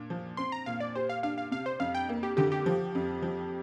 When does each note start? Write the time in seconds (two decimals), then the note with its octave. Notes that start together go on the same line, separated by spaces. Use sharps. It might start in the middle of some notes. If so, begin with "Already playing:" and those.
Already playing: A#2 D4
0.10 F3
0.37 C4 C6
0.52 A#5
0.66 A#2 F5
0.80 D5
0.95 G4 C5
1.09 F5
1.23 D4 F5
1.38 F5
1.51 C3 F5
1.66 C5
1.80 F2 F5
1.95 G5
2.09 A#3
2.23 G4
2.37 D3 G4
2.52 G4
2.66 F3
2.95 F2
3.22 F3